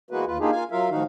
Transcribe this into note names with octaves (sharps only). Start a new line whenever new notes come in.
E3 G#3 A#3 B3 F#4 B4
D#2 F4 B4
A#3 D4 D#4 F4 G4 G#4
A#3 F4 F5 G#5
F#3 F4 A#4 E5 F5
A2 D#3 F3 D#4 F#4 F5